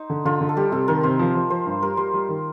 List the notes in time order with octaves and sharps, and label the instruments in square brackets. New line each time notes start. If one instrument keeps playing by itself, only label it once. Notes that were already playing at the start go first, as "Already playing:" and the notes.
Already playing: [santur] D#4 C5
[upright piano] D3
[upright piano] D3 [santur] F4
[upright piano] D3
[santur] A4
[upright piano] G3 [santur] G4
[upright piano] C3 [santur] A4
[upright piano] D#3 [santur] A#4
[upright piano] C3 [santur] C5
[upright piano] F3
F3
[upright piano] F3 [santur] C5
[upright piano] G2
[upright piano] G3 [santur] A#4
[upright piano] G3 [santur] C5
[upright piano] G3
D#3